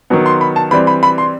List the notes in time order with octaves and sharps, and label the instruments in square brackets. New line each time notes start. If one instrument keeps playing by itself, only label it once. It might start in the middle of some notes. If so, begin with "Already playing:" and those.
[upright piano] D#3 F#3 B3
C6
B5
A5
E3 G3 C4 B5
B5
B5
C6